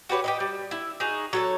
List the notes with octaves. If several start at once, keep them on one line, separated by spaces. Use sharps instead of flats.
F#4 G4 B4 C#5
G4 B4 D#5
G3
E4
D#4 F#4 G#4
F#3 A4 C#5